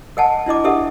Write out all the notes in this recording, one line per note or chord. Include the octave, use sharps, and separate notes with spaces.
A#4 D#5 F#5 G#5 A5
D4 E4 D#5 D6
D4 G4 A4 A#4 E5 F#5